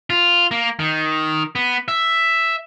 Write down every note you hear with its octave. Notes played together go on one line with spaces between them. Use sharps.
F4
A#3
D#3
B3
E5